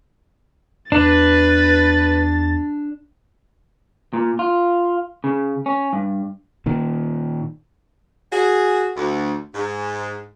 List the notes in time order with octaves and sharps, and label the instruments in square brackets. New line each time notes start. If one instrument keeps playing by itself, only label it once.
[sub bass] E2 [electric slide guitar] D4 [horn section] B4 [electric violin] A6
[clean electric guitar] A#2
F4
C#3
C#4
G2
[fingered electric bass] A#2 D#3
[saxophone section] F#4 G#4
D2
G#2